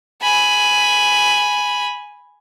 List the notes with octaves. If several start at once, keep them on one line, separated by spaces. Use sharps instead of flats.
G#5 B5